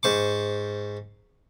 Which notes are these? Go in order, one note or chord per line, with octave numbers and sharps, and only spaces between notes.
G#2 C5 C#6 D6